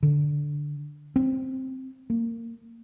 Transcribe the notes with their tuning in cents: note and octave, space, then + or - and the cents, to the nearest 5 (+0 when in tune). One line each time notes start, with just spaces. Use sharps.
D3 +0
C4 +5
A#3 -20